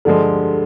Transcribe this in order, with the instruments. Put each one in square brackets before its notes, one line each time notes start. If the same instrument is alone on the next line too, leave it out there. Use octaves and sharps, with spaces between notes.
[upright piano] G2 D3 F3 G#3 [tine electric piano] G4 A4